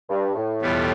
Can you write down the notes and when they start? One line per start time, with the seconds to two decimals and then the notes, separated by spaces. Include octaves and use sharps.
0.10 G2
0.35 A2
0.62 E2 B2 G3 B3 F4